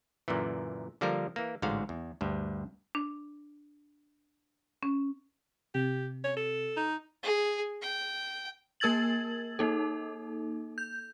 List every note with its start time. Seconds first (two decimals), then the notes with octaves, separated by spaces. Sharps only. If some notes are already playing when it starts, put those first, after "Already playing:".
0.28 F#2 A#2 D3 E3
1.01 D3 F3 G3 A#3 A4 A#4
1.36 E3 A#3
1.62 A1 G#2 D3 F#4 F5
1.89 E2
2.21 D2 G2
2.95 D4
4.83 C#4
5.75 C3 G4
6.24 C#5
6.37 A4
6.77 D#4
7.23 G#4
7.82 G5
8.80 A#3 A#4 E6 G#6 A6 F#7
9.59 A#3 D#4 A4
10.78 G6